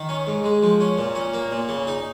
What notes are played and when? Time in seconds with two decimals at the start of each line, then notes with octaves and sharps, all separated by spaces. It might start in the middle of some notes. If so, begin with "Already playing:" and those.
Already playing: D#3
0.09 C#4
0.27 G#2
0.44 G#3
0.63 F3
0.81 C#4
0.98 A#2
1.15 C#4
1.34 A#3
1.51 A#2
1.69 C#3
1.87 D#4